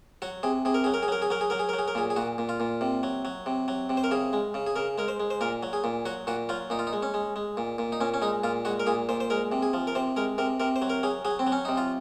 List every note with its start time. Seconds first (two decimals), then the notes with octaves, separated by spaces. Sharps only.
0.22 F#3 F#4
0.43 C3 G#4
0.65 C3 G#4
0.74 A#4
0.84 F#3 G#4
0.94 A#4
1.03 G#4
1.08 F#3 A#4
1.22 G#4
1.30 F#3 A#4
1.41 G#4
1.50 F#3 A#4
1.59 G#4
1.69 A#4
1.73 F#3
1.79 G#4
1.88 A#4
1.95 A#2 G#4
2.10 G#4
2.16 A#2 F#4
2.38 A#2
2.49 F4
2.60 A#2
2.81 C3
3.03 F#3
3.25 F#3
3.46 C3
3.68 F#3
3.90 C3
3.97 C5
4.04 A#4
4.11 C#3 G#4
4.33 G#3
4.54 C#3
4.66 G#4
4.76 C#3 A#4
4.98 G#3 A#4
5.08 C5
5.20 G#3
5.30 C5
5.41 A#2 A#4
5.63 F#3
5.73 G#4
5.84 A#2
6.06 F#3 F#4
6.27 A#2 F#4
6.49 F#3 F4
6.70 A#2 D#4
6.79 F4
6.87 D#4
6.93 G#3
7.03 C#4
7.14 G#3
7.36 G#3
7.57 A#2
7.78 A#2
7.92 D#4
8.01 A#2 C#4
8.14 C#4
8.22 G#3 D#4
8.44 A#2 F4
8.65 G#3 F#4
8.80 A#4
8.87 A#2 G#4
9.09 A#2 C5
9.20 C5
9.30 G#3 A#4
9.52 C3
9.63 G#4
9.73 F3
9.87 A#4
9.95 C3 C5
10.16 G#3 A#4
10.38 C3 A#4
10.60 C3 A#4
10.76 C5
10.82 F#3
10.90 A#4
11.03 F#3 G#4
11.25 F#3 G#4
11.39 C4
11.47 F#3
11.52 C#4
11.65 C3 D#4
11.77 F4